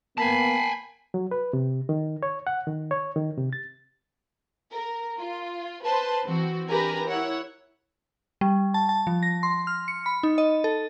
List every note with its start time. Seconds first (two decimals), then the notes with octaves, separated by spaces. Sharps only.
0.18 A#3 B3 G#5 A5 B5 C7
1.14 F#3
1.31 B4
1.53 C3
1.89 D#3
2.23 C#5
2.47 F#5
2.67 D#3
2.91 C#5
3.16 D#3
3.37 C3
3.53 A6
4.70 A#4
5.19 F4
5.84 B4 C5 A5 C6
6.24 E3 C4 F#4
6.69 D4 G4 A#4 B4 G#5 A#5
7.06 E4 C#5 F#5
8.41 G3
8.74 A5
8.89 A5
9.07 F3
9.23 A#6
9.43 C6
9.67 F6
9.88 C#7
10.06 B5
10.23 D#4
10.38 D#5
10.64 A4